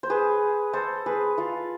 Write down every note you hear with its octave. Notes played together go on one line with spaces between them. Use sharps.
C5
G#4 B4
A4 C5
G#4 B4
F4 A4